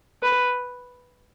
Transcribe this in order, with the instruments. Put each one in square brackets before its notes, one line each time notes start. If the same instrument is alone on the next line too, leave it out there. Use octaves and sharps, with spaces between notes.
[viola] B4